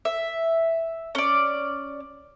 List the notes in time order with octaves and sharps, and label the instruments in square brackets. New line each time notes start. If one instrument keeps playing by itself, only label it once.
[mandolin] E5
C#4 D5